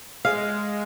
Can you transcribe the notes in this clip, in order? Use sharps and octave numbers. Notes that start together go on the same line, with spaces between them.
G#3 F5